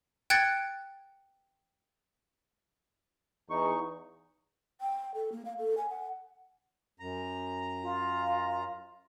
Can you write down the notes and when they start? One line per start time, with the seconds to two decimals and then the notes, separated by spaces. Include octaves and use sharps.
0.30 G5 F#6 G#6 A6 C#7
3.50 E2 D#4 C#6
4.81 G5
5.15 A4
5.32 A#3
5.45 F5
5.58 A4
5.77 G#5
5.89 F#5
7.00 F#2 A#5
7.82 F4